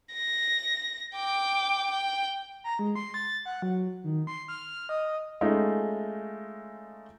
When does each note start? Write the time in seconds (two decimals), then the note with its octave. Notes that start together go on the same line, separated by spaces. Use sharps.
0.13 A#6
1.15 G5 D6
1.90 G5
2.64 A#5
2.79 G#3
2.95 C6
3.14 A6
3.46 F#5
3.62 F#3
4.04 D#3
4.27 C6
4.48 F6
4.89 D#5
5.41 G#3 A3 C#4 D#4 F4